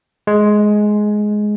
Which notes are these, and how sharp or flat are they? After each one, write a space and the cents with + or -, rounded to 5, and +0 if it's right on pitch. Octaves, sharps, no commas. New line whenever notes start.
G#3 +10